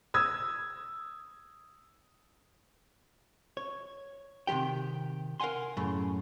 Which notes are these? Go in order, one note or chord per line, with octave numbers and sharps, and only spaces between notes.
D#6 E6 G#6
C#5
C3 D#3 G#3 G4 G5
A#4 F5 F#5 G#5 C6
F#2 A2 C#3